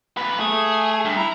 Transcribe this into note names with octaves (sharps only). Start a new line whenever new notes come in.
A#2 B4
A3 G#4
G2
E4 A#5